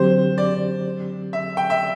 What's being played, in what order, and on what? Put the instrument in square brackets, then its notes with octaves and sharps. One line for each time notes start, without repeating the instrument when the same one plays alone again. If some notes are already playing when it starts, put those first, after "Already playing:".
Already playing: [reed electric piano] D3 F#3 C4 G4 [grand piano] C5
[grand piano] D5
E5
G5
E5